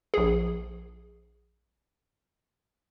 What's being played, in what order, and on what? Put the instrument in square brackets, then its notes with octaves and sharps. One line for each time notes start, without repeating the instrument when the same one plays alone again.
[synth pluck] A#1 G#4